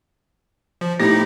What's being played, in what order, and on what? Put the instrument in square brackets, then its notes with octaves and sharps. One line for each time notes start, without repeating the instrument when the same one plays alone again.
[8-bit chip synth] F3
[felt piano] A2 A#6 [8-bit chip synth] D#4 E4 G4